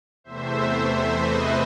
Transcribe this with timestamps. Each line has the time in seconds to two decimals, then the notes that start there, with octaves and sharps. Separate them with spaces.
0.24 E2 C3 E3 A3 C5 E5
1.15 B4 D#5